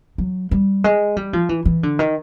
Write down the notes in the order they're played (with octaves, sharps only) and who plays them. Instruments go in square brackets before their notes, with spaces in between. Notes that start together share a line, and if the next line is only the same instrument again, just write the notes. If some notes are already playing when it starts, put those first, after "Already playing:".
[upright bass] F#3
G3
G#3
G3
F3
E3
E3
D3
D#3